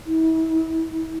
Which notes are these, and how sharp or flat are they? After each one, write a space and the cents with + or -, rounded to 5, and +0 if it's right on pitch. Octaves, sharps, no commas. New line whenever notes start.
E4 -35